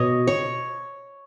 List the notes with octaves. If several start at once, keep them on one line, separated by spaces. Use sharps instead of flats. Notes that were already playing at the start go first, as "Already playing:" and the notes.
Already playing: B2 C#5 D#5
C#5